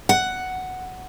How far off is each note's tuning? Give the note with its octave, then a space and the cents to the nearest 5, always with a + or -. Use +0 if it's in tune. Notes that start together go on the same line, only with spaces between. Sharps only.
F#5 +5